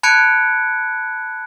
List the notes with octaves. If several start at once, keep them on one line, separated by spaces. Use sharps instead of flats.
A5 B5 F#6 G#6 C#7 D7